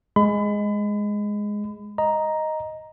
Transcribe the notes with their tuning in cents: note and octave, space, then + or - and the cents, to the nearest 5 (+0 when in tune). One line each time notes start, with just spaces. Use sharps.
G#3 +0 B5 +35
D#5 +0 A#5 +5